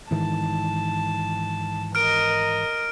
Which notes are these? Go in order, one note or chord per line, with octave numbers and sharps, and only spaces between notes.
G#2 D#3 E3 A5
A#4 D#5 F6 D7